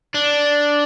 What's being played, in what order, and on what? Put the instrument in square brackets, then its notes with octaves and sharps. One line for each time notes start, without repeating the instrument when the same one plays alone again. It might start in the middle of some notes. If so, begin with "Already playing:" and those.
[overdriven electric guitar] D4